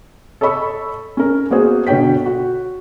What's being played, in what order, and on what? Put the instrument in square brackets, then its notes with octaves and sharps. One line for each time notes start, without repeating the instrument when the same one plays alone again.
[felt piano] A4 C#5 D#5 B5 C#6 E6
C#4 A#4
A#3 B3 F#4 G#4 C5
B2 D3 C#5 G5 B6
F#4